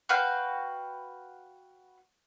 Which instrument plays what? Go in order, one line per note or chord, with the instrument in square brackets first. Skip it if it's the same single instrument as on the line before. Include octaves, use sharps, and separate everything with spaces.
[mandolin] F#4 B4 F5 G5